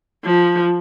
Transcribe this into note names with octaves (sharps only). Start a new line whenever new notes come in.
F3